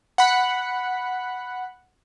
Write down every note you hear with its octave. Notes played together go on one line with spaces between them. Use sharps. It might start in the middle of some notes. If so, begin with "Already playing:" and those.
F#5 B5